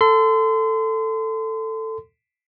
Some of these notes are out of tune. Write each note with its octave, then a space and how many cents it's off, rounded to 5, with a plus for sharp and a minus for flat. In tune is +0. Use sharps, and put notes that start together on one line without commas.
A4 +10 C6 -35